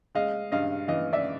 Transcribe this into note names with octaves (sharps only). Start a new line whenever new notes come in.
G#3 D#5 F5
G2 D#5 F5
E3 D#5 F5
D5 E5